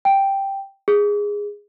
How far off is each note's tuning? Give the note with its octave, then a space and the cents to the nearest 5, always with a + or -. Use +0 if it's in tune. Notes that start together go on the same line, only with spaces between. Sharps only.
G5 +0
G#4 -15